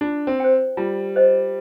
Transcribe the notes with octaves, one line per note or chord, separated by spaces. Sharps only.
D4 F4
C4
C5 G5
G3 F4
C5 D#5